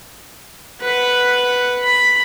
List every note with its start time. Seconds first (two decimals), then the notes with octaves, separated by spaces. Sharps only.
0.81 B4 F#5
1.83 B5